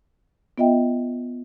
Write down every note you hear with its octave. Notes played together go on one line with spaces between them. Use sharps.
B3 F4 D#5 E5 G5